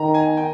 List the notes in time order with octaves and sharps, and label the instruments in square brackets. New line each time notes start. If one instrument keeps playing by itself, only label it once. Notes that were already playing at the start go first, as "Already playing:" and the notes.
Already playing: [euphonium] D#3 [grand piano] A#5
[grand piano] G#5
G5